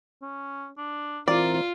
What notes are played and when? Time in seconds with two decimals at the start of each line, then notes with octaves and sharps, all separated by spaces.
0.22 C#4
0.77 D4
1.28 E3 C4 F4 A#4 D5